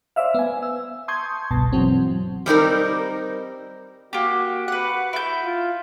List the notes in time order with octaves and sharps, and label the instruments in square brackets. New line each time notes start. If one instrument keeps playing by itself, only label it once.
[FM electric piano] C5 D5 E5 F5
B3 G#5
E6
A5 C6 C#6 D#6 G6 G#6
G1 C2 G2 B2 A5
B2 E3 F#3 C4
[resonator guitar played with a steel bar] G3 C4 D#4 A#4
[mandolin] A#3 G4 [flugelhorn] F#4
[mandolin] B4 F#5
E4 G6
[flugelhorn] F4